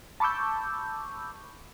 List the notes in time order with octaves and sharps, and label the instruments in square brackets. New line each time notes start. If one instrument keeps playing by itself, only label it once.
[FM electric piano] A5 B5 C#6 D6 E6 G6